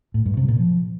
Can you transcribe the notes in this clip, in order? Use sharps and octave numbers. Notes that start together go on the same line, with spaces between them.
A2
G2
C3
A#2
F3